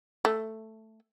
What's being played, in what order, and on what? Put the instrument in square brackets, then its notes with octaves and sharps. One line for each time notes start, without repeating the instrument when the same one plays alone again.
[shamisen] A3